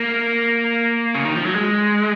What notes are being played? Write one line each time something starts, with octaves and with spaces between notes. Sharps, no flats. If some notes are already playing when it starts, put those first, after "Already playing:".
Already playing: A#3
C#3
D#3
F3
F#3
G#3